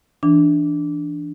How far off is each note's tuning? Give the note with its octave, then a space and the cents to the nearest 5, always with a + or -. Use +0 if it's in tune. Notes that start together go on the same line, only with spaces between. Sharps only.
E3 +0 D4 +0